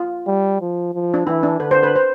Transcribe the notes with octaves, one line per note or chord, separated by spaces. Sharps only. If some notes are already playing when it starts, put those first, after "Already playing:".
Already playing: F4
G3
F3
F3
D4
E3 E4
D4
D3 B4
C5
B4
C5